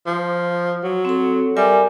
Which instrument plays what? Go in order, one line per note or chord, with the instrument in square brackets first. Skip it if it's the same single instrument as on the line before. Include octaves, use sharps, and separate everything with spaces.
[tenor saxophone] F3
F#3
[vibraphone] C4 A4
[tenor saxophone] G3 [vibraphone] A#4 E5 G#5